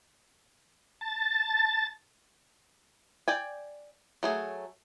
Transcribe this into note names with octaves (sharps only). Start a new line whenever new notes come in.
A5 A6
D5 G5 G#5
F#3 A3 G#4